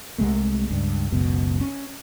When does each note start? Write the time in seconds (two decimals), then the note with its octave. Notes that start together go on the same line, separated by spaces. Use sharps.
0.18 C2 C3 G#3 A3
0.71 C#2 G2
1.11 F#1 C#2 F#2 B2
1.61 C#4